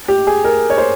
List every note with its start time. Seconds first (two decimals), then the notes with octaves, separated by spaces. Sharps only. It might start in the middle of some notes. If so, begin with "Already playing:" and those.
0.08 G4
0.27 G#4
0.44 A#4
0.70 C#5
0.78 C5